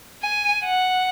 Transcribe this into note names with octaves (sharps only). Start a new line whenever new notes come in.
G#5
F#5